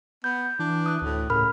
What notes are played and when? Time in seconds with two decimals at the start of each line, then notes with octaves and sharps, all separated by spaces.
0.24 B3 G6
0.59 E3 D4
0.86 D#6 F#6
1.02 D2 A2
1.30 A2 C#3 A#4 B5 F6